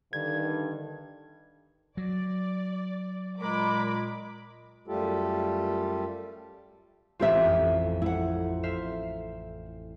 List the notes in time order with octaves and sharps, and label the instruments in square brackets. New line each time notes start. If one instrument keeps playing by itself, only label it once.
[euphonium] G2 [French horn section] D3 D#3 [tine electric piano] G#6
[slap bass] F#3 [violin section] D5
[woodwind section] A#2 G#3 [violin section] A#4 B5 D6
[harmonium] F#2 G3 A3 F4 G4 A4
[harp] A1 C4 [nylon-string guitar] F4 G4 E5
[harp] F2
[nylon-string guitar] E4 F#5
[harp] C5 E5 F5